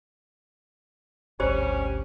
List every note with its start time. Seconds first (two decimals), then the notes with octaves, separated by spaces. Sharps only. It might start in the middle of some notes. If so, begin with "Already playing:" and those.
1.40 G#1 D2 G3 C#4 G4 C5 D5